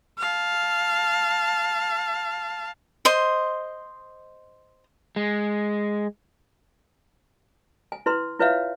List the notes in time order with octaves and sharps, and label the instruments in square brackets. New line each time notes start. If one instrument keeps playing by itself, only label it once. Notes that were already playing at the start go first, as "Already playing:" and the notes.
[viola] F5 A5
[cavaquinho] C5 D#5 C6
[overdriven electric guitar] G#3
[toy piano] G#5
E4 B4 C6
E4 F4 B4 C#5 E5 F5